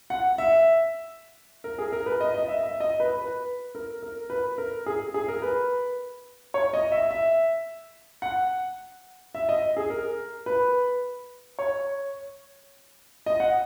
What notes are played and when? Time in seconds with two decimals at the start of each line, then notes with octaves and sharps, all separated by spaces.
0.10 F#5
0.38 E5
1.64 A#4
1.78 G#4
1.92 A#4
2.06 B4
2.21 D#5
2.34 D#5
2.48 E5
2.63 E5
2.80 D#5
3.00 B4
3.18 B4
3.75 A#4
4.02 A#4
4.30 B4
4.58 A#4
4.86 G#4
5.14 G#4
5.28 A#4
5.42 B4
6.54 C#5
6.73 D#5
6.92 E5
7.11 E5
8.22 F#5
9.35 E5
9.49 D#5
9.77 G#4
9.90 A#4
10.46 B4
11.59 C#5
13.26 D#5
13.40 F#5